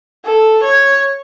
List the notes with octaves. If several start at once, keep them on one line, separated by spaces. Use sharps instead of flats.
A4
C#5